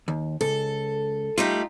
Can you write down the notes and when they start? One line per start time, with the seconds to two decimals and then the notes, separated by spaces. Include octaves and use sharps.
0.08 D#2
0.41 C#2 A4
1.38 G3 A3 D#4 F4 G4